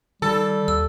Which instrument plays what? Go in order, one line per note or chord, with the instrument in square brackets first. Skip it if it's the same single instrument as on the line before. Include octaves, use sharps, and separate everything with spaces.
[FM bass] D#3 [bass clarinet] G3 [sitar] A4
[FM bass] D#2 [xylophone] E6